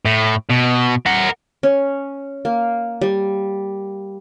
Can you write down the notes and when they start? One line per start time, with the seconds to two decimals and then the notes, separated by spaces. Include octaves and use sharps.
0.05 A2
0.49 B2
1.06 A#4 F#5
1.63 C#4
2.45 A#3
3.01 G3